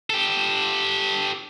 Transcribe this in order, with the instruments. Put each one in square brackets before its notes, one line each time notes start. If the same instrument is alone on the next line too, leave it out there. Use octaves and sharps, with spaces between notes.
[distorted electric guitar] G4 A4